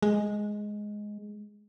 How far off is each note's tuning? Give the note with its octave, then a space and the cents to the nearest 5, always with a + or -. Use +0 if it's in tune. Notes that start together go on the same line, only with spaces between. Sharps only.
G#3 +5